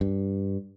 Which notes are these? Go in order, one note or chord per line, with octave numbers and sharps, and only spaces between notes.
G2